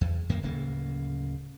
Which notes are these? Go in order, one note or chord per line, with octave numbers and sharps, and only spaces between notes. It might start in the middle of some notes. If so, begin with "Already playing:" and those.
E2
F#2 D#3 A#3
D1 C#3 A#3